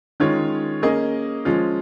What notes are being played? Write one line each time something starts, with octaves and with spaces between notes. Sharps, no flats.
D#3 G#3 C#4 F4 C#5
A#3 C#4 G#4 D#5
F3 G#3 C#4 F4